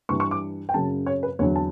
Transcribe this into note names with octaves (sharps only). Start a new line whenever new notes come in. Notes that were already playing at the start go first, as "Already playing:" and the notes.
G2 E3 G3 C#6
C#6
D6
G5
F#2 C#3 F#3 A5
C#5
B4
E2 D3 F#3 C#5
A5